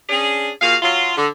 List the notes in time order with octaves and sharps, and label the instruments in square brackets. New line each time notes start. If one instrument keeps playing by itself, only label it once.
[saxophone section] C#4 D4 G#4
A#2 F#4 G#4 F5
F#3 F4
D3